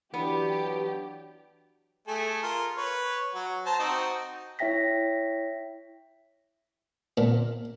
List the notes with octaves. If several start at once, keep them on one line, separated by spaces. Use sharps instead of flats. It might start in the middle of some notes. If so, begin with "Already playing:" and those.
E3 F#3 B3 D4 G4
A3 G#4 A4
F4 A#4
B4 C#5
F#3 F#4
C5 A5 A#5
C4 D#4 F#4
E4 C#5 E5 G5 A#6 B6
A#2